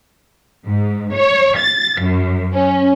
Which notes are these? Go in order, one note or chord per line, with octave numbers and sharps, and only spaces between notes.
G#2
C#5
A6
F#2
C#4